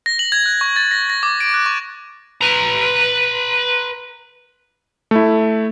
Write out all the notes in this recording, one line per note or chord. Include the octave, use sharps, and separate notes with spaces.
A#6
F#7
G#6
F#6
C#6
A6
A#6
A#6
D6
D7
F#6
C#6
B4 A#5
A3 E4